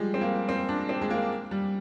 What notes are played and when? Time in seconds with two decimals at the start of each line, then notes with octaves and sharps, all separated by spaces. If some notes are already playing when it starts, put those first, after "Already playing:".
Already playing: F3 G3 G#3
0.14 C4
0.21 A#3
0.49 C4
0.69 D4
0.89 C4
1.02 G#3
1.10 A#3
1.51 G3